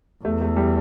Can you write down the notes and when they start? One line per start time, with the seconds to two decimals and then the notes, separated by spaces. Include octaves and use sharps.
0.25 E2 A3
0.41 A3
0.56 G3